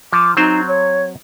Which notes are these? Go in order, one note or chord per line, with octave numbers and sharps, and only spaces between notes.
F3 D6
F#3 C4 D#4 C5
C#5